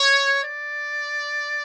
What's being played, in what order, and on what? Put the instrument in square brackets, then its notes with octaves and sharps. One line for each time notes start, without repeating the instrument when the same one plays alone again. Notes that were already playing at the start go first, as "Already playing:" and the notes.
Already playing: [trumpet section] C#5
D5